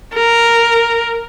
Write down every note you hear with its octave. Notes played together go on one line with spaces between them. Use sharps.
A#4